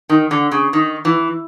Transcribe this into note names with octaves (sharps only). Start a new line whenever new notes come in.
D#3
D3
C#3
D#3
E3